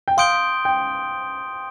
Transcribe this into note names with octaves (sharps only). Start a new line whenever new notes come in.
G5
F5 C6 D#6 G6 D7 G7
G5